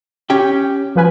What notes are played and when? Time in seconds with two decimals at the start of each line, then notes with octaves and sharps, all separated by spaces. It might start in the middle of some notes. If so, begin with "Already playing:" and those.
0.30 C#4 G4 G5
0.96 F3 B4 G#5